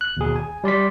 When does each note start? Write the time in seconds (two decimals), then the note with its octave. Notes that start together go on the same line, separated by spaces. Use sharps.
0.01 F#6
0.17 D#2 B2 G#4
0.36 G#5
0.64 G3 D5 C6 B6